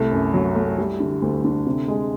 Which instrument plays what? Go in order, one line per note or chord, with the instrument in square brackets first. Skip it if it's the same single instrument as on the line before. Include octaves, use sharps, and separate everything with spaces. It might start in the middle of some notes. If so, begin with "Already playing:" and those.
Already playing: [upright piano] C2 A3
F#2
F#3
A3
G3
D3
D2
D3
C3
G#3